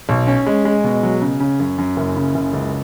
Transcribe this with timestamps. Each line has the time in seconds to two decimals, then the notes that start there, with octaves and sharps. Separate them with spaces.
0.09 B1
0.27 C#4
0.46 G#3
0.65 G#3
0.84 B2
1.03 F#3
1.22 C#3
1.40 C#3
1.60 F#2
1.78 F#2
1.97 F#1
2.17 C#3
2.35 F#1
2.53 C#2